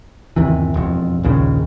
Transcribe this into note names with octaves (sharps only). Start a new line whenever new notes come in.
G1 D#2 C3 E3
E1 F2
A#1 D#2 C#3